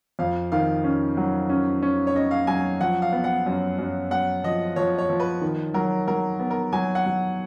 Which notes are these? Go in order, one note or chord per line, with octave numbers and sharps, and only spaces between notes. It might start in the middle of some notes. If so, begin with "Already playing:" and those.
F2 F5
D#3 F5
C#4
F#3
C#4
C#4
C#5
C#4 D#5
F5
F#3 G#5
F3 F#5
F5
B3
F#5
F#2
F#2
F#2 F#5
F3 D#5
F3 C#5
C#5
F3
B4
D#3
F#3 A#4
F#3 A#4
B3
A#4
F#3 G#5
F#5
F#3